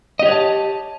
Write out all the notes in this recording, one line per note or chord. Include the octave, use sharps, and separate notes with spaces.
G4 C#5 D#5 F#5 A5